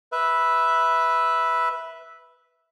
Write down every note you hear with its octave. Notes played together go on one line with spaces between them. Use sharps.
B4 E5